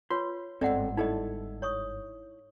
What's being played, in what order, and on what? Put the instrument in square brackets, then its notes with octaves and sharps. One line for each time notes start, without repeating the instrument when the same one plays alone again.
[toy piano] F4 B4 C#5 [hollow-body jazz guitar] C6
[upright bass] G1 G#2 [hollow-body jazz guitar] C4 A4 [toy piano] D5 D#5 F#5
[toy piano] D#4 D#5 [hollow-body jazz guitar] E4 A4
[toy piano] C#5 C#6 D#6